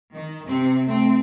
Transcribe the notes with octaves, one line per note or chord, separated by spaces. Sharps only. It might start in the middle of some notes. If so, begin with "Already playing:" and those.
D#3
C3 C4
A3 C4